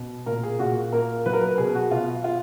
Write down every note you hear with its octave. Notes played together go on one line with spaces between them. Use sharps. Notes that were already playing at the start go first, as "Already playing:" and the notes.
Already playing: B2
A#2 A#4
G#4
A#2 F#4
A#3 A#4
F#3 B4
A#4
B4
B2 G#4
F#4
B2 F4
F4